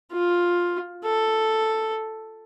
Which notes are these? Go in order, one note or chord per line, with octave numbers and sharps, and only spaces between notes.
F4
A4